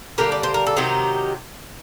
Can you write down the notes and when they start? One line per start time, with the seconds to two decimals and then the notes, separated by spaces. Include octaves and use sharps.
0.18 D3 G3 A#3 G4 A#4
0.32 D5
0.43 C5
0.54 A#4
0.67 A4
0.77 C3 D#3 F#3 D#4 G4